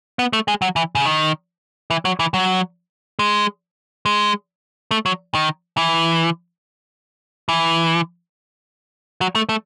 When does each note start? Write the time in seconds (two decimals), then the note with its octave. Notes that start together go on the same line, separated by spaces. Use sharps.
0.19 B3
0.33 A3
0.48 G#3
0.62 F#3
0.76 E3
0.95 C#3
1.05 D#3
1.90 E3
2.05 F#3
2.19 E3
2.34 F#3
3.19 G#3
4.06 G#3
4.91 A3
5.06 F#3
5.35 D#3
5.77 E3
7.49 E3
9.21 F#3
9.35 A3
9.49 A3